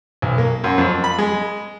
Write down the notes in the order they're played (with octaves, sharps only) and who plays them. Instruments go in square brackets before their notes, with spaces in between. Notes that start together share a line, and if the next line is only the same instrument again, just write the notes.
[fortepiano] B1
A#3
F#2
F2
B5
G#3